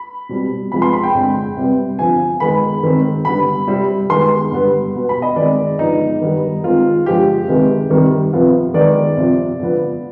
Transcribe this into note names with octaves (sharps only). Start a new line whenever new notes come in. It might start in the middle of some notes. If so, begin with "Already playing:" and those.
Already playing: B5
B2 G3 C4
C3 F3 G#3 B3 B5
C6
B5
G5
D3 G#3 C4
C3 G3 B3
D3 F3 C4 G#5
D#3 G#3 B3 B5
D#3 G#3 C4
D3 G3 B3 B5
C3 G3 C4
D#3 G#3 B3 C6
D3 G3 B3
B2 B3
B5
D#5
D#3 G#3 C4 D5
D3 F3 G#3 B3 D#4
D#3 G3 B3
D#3 G#3 C4 F4
D3 F3 G#3 G4
C3 D#3 G#3 B3
C3 D#3 G3
C3 F3 B3
D#3 G#3 B3 D5
C3 F3 C4
D3 F3 B3